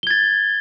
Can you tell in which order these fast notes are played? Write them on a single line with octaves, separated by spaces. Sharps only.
G7 G#6 A6